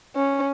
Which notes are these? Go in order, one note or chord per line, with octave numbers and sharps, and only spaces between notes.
C#4